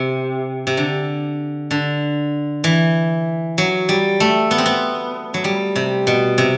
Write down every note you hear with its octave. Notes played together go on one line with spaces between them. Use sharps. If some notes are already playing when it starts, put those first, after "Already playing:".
Already playing: C3
C3
D3
D3
E3
F#3
G3
A3
B3
C4
B3
F#3
G3
C3
B2
C3